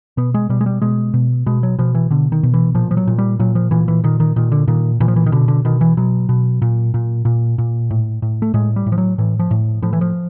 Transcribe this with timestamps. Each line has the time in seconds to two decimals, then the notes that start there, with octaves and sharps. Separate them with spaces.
0.17 B2 B3
0.34 G#3
0.49 B2 G3
0.61 G#3
0.66 G3
0.82 B2 G#3
1.14 B2
1.46 B2 G#3
1.63 F#3
1.79 B2 F3
1.95 E3
2.10 B2 D3
2.32 D#3
2.43 B2
2.54 E3
2.75 A#2 F3
2.91 F3
2.97 F#3
3.07 A#2
3.18 G3
3.39 A#2 F#3
3.55 F3
3.71 A#2 E3
3.88 E3
4.04 A#2 D#3
4.20 D#3
4.36 A#2 D#3
4.52 D3
4.68 A#2 D#3
5.00 A#2 E3
5.08 F3
5.16 E3
5.26 D#3
5.32 B2 D3
5.48 D3
5.65 B2 D#3
5.81 E3
5.97 B2 F#3
6.29 B2
6.62 A#2
6.94 A#2
7.25 A#2
7.58 A#2
7.90 A2
8.22 A2
8.42 A3
8.54 A2 G#3
8.76 G3
8.86 A2
8.92 F3
8.98 F#3
9.18 A2 E3
9.39 F3
9.51 A2
9.82 A2 F3
9.93 E3
10.01 F3